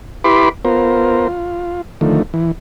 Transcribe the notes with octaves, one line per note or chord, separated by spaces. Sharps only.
E4 G4 B4 B5 C6 D6
B3 F4 A#4 C5
F4
D3 D#3 F3 A3
E3